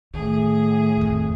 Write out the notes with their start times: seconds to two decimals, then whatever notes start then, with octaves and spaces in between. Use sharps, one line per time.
0.14 A2 D#3 G#4
0.97 F2 D#3